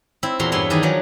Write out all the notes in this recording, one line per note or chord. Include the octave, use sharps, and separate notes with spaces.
C4 E4
E2 A#2 F#4 A#5 C6
G2 B3 E4 C#5 C6
D#3 E3 D4 D#4 G#4 A#4
F3 F#3 G#4